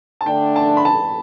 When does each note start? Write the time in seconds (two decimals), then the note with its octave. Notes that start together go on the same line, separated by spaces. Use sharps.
0.21 A5
0.26 D3 A3 D4 G5
0.56 A5
0.77 B5
0.85 A5